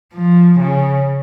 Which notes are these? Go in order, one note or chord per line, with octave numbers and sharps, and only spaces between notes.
F3
C#3